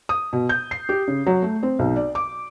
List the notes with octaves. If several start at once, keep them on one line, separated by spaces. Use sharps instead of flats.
D#6
B2
G6
C7
G4
C#3
F#3
A3
C4
B1
D5
D6